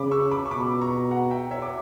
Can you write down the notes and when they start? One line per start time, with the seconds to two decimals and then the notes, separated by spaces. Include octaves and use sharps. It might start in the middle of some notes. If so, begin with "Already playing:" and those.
Already playing: C#3 B5 D6
0.11 C#6 E6
0.31 B5 D6
0.46 C#6
0.51 B2 B5 D6
0.81 A#5 C#6
1.11 F#5 A#5
1.31 E5 G5
1.51 C#5 E5
1.62 D6